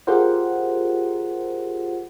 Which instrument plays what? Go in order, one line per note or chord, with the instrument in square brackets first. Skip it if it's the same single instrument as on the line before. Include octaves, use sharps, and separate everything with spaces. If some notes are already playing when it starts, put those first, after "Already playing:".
[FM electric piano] F4 G4 G#4 A#4 C5 F#5